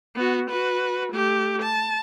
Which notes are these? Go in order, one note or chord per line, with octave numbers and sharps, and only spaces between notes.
B3 F#4
F#4 B4
A3 G4
A5